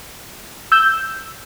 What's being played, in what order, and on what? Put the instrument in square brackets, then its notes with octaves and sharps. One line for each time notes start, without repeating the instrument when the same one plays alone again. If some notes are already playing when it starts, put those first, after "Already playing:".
[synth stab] E6 G6